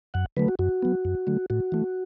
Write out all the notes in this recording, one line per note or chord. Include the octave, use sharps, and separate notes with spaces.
F#2 F#5
D3 F#3 A3 B4
F#4
F#2 F#4
F#3 B3
F#2
D3 F#3 A3
A2 F#4
E3 A3